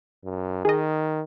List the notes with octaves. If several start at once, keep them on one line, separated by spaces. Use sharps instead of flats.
F#2
D#3 G#4 D#5